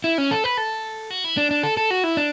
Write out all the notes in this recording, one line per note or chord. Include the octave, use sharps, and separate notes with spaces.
E4
C#4
A4
B4
A4
F#4
E4
D4
D4
A4
A4
F#4
E4
D4